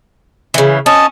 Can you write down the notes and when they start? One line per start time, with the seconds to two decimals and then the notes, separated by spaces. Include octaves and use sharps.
0.54 C#3 E3
0.86 C#4 D#5 A5